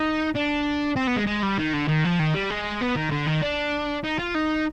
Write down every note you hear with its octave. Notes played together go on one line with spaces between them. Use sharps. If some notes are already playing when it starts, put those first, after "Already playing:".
Already playing: D#4
D4
C4
B3
G#3
G#3
G3
D#3
D3
D#3
F3
D#3
G3
G#3
B3
D#3
D3
D#3
D4
D#4
F4
D#4